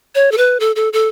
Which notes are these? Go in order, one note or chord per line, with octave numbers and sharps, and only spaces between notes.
C#5
A4
B4
A4
A4
A4